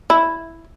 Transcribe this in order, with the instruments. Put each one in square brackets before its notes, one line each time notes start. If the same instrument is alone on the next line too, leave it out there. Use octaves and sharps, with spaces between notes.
[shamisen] E4